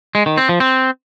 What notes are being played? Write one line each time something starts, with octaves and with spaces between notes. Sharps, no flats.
G#3
D#3
C4
F3
C4